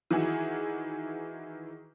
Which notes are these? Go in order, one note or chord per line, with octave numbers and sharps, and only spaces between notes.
D#3 E3 E4 F#4 G#4